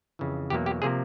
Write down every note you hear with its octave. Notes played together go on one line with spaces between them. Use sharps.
F2 C#3 E3
E2 B2 F#3 A#3 G4
G4
C3 F3 A#3 G#4